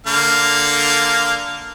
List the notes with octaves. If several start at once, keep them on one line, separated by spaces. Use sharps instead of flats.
D3 A#3 F5